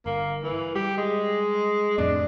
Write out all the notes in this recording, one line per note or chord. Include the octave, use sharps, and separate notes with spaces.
G1 A#3
E3
G3 G4
G#3
F2 A2 C3 D4